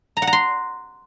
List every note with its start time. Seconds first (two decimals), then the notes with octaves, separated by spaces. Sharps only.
0.17 A#5
0.22 F#5
0.27 A#5
0.33 C6